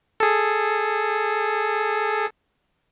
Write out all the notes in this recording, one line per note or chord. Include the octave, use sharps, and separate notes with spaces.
G#4 A4